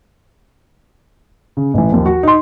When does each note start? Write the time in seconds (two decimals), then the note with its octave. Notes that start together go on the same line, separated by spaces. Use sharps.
1.57 C#3
1.74 A1 E3
1.92 D#2 F3
2.06 F#4
2.23 D#4 C6